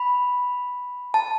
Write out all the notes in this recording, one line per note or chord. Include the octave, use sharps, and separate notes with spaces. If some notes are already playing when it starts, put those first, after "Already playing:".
Already playing: B5
A5